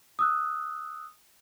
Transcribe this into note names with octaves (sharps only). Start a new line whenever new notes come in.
D#6 E6 F#6